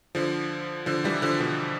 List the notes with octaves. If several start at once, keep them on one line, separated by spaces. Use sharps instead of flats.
D3 F3
D3 F3
E3 G3
D3 F3
B2 D3